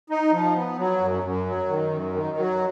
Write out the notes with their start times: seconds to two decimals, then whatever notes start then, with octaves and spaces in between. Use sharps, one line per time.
0.10 D#4
0.32 F3
0.55 B3
0.78 F#3
1.00 F#2
1.23 F#2
1.46 F#3
1.68 D#3
1.90 F#2
2.13 D#3
2.37 F#3